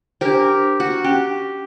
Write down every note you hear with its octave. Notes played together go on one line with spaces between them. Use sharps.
D4 G4 A#4 C5
F#4
C#4 G4